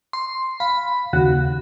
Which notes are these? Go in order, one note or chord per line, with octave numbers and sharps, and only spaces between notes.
C6
F5 B5
D#2 C#3 F#4